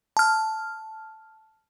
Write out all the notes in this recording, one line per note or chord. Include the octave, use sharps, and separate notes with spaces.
A5 F6